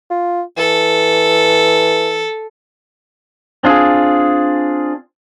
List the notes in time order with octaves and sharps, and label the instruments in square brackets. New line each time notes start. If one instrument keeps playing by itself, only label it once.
[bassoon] F4
[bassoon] E3 [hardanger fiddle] A4
[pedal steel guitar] C4 D4 F4 G#4